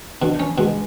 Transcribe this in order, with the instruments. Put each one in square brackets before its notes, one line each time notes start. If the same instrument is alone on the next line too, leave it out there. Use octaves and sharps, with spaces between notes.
[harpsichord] B2 [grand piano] D4
[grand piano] B3 [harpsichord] C#4
[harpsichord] B2 [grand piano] G#3